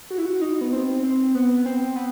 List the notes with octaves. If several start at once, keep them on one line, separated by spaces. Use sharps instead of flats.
F#4
E4
F#4
D#4
B3
C4
C4
B3
C4
B3